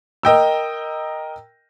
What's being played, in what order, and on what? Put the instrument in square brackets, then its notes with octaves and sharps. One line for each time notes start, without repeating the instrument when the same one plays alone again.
[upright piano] A#4 D#5 G5 E6